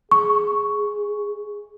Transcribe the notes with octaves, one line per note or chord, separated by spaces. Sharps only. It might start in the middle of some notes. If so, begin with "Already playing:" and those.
G#4 C#6